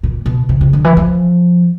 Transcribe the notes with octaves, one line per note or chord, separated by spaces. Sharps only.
A#2
B2
C3
C3
D3
E3
F3